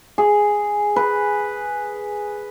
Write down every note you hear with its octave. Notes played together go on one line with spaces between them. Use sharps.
G#4
B4